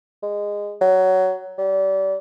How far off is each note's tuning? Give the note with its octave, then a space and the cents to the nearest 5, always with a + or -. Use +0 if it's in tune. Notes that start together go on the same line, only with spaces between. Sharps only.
G#3 -15
F#3 +15
G3 -30